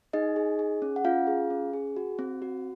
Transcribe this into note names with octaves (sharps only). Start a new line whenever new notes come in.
D#4 G#4 D#5
G#4
G#4
C#4
F#5
C#4 F4 F5
G#4
C#4
G#4
F#4
C4
F#4